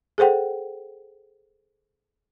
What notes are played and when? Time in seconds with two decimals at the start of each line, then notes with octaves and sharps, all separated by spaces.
0.18 G#4 A4 C5 F#5 G5